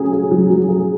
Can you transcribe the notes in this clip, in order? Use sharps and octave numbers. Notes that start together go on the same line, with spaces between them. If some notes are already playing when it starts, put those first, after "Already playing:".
Already playing: F#3 C#4 G#4
G#4
F#3
F#3
G#4